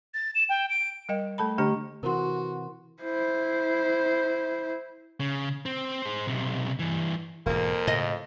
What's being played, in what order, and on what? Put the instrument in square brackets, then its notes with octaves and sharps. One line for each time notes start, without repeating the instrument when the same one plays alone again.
[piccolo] A6
E7
G5
D7
[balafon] G3 A#4 D#5 G5
A3 A4 A5 B5
D3 A3 D4 G4 D#5 A#5
[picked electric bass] C3 E3 [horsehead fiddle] F#4 [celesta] A#4 C6
[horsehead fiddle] E4 C5
[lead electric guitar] C#3
C4
G#4 C5
B1 C3
G2 E3
[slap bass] E1 G#2 [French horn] F2 [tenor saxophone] A#3
[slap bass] A2 C#3 [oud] D#5